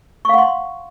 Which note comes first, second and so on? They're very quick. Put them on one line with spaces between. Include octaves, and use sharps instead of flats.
C#6 F5 F#5 C6